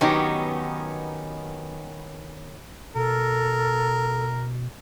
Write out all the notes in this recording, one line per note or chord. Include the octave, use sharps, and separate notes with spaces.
D#3 F#3 B3 C#4 D#4 G4
B2 A4 A#4